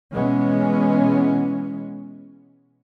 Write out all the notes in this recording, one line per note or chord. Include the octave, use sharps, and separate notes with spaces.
B2 E3 G#3 B3 C#4